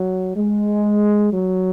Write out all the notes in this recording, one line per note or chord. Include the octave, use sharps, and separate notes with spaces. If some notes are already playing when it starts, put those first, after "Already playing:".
Already playing: F#3
G#3
F#3